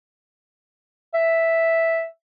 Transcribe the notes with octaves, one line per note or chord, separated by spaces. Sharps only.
E5